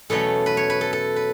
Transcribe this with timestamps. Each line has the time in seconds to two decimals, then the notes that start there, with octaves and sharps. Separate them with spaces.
0.10 E2 B2 F#3 A3 C#4 A4
0.46 B4
0.57 C#5
0.70 B4
0.81 A4
0.93 A4
1.16 B4